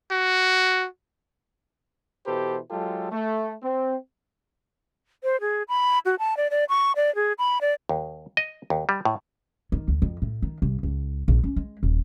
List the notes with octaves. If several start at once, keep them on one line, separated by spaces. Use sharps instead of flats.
F#4
B2 E3 G4 A4 B4 C5
F#3 G#3 F4 G4 A4
A3
C4
C5
G#4
B5
F#4
A5
D5
D5
C#6
D5
G#4
B5
D5
D#2
D#5
D#2
G3
A2
D#3
D2
F2
A2
D#3
C2
C#2
A#1
C#4
G#3
D#1